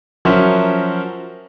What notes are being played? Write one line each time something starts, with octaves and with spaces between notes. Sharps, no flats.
F3 F#3 C#4 A#4 C5 E5